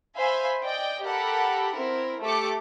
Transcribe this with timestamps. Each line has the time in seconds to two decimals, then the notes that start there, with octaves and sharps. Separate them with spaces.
0.17 C5 E5 F5 G#5 B5 C6
0.63 D5 D#5 G5
1.05 G4 A4 A#4 F#5 B5
1.74 C4 E4 A#4
2.23 A3 G4 A4 D6 C#7